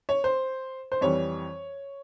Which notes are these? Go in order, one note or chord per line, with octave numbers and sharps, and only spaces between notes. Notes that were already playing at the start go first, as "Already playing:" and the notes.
C#5
C5
C5
F2 E3 G3 C#5